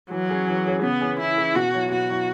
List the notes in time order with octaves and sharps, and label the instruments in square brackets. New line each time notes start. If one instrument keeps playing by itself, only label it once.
[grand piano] E3 [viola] F#3
[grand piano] C#4 G#4 C#5
E3
C#4 G#4 C#5
[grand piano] C#3 [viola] B3
[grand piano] E3 C#4 G#4 B4
[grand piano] C#3 [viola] E4
[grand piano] E3 C#4 G#4 B4
[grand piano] B2 [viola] F#4
[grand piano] F#3 E4 C#5
[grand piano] B2 [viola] F#4
[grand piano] F#3 E4 C#5